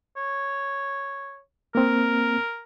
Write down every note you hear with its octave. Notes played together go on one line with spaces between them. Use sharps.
C#5
A#3 C4 A#4